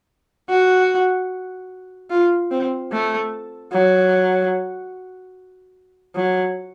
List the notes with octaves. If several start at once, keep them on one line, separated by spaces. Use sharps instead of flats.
F#4
F4
C4
A3
F#3
F#3